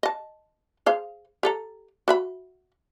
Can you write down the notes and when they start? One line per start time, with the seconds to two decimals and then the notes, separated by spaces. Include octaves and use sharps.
0.03 D#5 A5
0.86 G#4 C5 F5
1.43 G4 A4 A#5
2.08 F#4 E5 B5